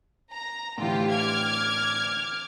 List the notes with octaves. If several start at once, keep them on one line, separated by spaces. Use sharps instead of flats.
A#5
A2 D3 E3 F4 G4 G5
D6 F6 G#6